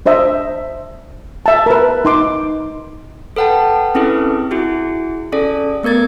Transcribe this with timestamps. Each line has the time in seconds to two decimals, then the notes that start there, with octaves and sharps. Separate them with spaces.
0.06 D4 C5 D#5 E5
1.46 E5 A5
1.66 A#4 B4
2.05 D#4 C6 D6
3.36 A4 B4 F#5 G5 A5
3.95 C4 C#4 E4 G#4 A4 B4
4.51 E4 F#4 G#4
5.32 C#4 G#4 A4 D5
5.83 A3 B3 A#4 G#6 A6